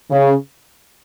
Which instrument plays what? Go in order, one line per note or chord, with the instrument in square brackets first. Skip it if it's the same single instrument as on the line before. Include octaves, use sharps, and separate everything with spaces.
[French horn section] C#3